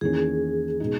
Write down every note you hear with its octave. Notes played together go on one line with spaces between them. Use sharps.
E2 D#3 A#3 C#4 G#4
B2 G#3 D#4